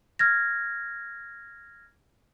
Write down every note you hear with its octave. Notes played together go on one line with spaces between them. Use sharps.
F6 G#6 A#6